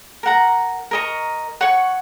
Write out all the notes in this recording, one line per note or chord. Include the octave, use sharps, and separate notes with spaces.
A#4 F#5 A#5
A#4 D#5 A#5 C#6
C#5 F#5 C#6